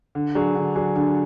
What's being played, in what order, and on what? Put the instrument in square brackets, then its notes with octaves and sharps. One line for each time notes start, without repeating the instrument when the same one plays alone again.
[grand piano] D3
F#3 D4 G#4
D3
F#3 D4 G#4
D3